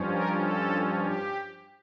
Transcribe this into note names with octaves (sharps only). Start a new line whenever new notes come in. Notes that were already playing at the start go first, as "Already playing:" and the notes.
Already playing: G2 F3 C#4
A#4
A4
G4